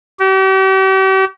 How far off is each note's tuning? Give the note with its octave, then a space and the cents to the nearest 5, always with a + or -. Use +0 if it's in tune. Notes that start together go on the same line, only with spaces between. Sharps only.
G4 -40